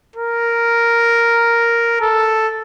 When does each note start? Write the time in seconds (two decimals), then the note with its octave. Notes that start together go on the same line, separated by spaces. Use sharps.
0.16 A#4
2.01 A4